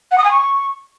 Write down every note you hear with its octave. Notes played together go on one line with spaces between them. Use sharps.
F#5
D#6
G#5
C#6